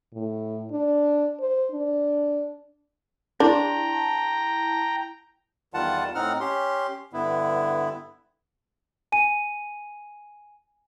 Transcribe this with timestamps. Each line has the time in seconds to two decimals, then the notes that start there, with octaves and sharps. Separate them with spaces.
0.14 A2
0.71 D4
1.40 C5
1.72 D4
3.40 D4 E4 G5 A5 A#5
5.74 E2 D#3 G3 F4 F#5 A5
6.15 A2 C4 D#4 F#5 F6
6.40 C#4 G4 C6
7.13 G2 D3 B3 E4
9.12 G#5 D#7